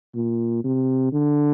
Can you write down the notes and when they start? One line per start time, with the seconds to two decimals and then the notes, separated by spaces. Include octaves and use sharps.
0.15 A#2
0.64 C3
1.13 D3